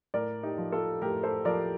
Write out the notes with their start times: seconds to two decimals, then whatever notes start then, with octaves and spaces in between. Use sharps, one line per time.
0.14 A2 A#4 D5
0.43 D#4 G4
0.58 F3
0.72 F4 A4
1.01 A2 G4 A#4
1.23 A4 C5
1.45 F3 A#4 D5